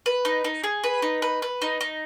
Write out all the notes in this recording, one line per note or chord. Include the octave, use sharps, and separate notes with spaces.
B4
D#4
D#4
G#4
B4
D#4
B4
B4
D#4
D#4